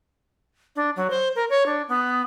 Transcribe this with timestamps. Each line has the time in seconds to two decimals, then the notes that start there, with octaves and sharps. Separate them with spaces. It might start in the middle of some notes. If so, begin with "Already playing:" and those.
0.76 D4
0.96 F#3
1.10 C5
1.35 A#4
1.50 C#5
1.66 D4
1.88 B3